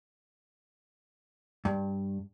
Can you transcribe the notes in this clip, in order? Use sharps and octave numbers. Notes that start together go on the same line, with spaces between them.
G2